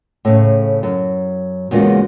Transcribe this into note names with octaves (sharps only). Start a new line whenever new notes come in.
A2 C#3
F#2
E2 C#3 G#3 A#3 F4 F#4